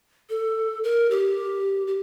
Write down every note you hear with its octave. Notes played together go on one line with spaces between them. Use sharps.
A4
A#4
G4
G4